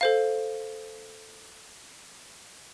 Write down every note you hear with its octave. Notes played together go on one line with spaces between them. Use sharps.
A4 C5 F5